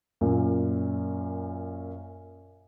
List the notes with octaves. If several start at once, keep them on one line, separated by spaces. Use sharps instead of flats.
F#2 A#2